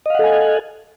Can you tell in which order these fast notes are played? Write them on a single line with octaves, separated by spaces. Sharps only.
D#5 F5 F#5 A4 G#5